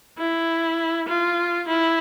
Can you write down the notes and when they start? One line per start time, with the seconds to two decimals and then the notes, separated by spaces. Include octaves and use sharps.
0.18 E4
1.08 F4
1.68 E4